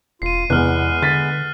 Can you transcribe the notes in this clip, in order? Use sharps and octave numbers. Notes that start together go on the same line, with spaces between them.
E1 F4 C7 D#7
E2 C3 G#3 B3 F6 F#6
D3 A6 B6